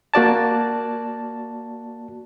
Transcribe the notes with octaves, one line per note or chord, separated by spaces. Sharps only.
A#3 F#4 D5 A5